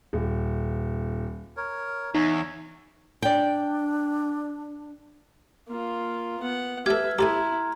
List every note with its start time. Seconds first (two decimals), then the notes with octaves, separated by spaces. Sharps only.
0.13 D#1
1.57 A#4 C#5
2.14 E2 D#4 C#5
3.22 D4 D5 G5
5.68 A#3 F4
6.41 B3 F#5
6.86 G4 A4 B4 E5 F6 G#6
7.19 E4 G4 A4 G#5 A#5 C6